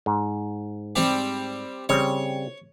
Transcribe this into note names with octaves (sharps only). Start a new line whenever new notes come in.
G#2
G3 C4 G4
C#3 G3 C4 C#5